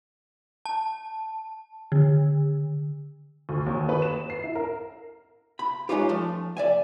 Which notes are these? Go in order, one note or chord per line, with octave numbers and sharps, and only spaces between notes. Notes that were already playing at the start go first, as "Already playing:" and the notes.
A5
D3
D2
D#2
B4
E7
C7
E4
A#4
B5
G#3 C4 C#4 D#4 F4 G4
F3 A3 C6
D5 E5 G#5